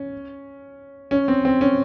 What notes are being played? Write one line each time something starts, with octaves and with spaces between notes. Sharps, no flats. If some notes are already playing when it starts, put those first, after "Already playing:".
Already playing: C#4
C#4
C4
C4
C#4